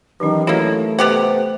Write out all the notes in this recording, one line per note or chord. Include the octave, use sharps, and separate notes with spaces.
G2 D#3 E3 F#3 C#4
A3 A#3 E4 F#4 C#5
C3 B3 G4 F#5